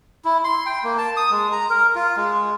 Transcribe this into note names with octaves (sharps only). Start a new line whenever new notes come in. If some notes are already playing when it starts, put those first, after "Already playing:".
E4
C6
G5
A#3
A5
D#6
G#3
A#5
A#4
F4
G#3